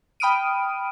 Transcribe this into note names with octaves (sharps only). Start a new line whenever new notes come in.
G5 B5 D#6 F6 D7 D#7